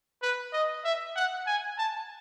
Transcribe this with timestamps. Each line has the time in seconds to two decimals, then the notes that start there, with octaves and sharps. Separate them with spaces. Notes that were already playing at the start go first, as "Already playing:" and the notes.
0.22 B4
0.53 D#5
0.84 E5
1.16 F#5
1.47 G#5
1.78 A5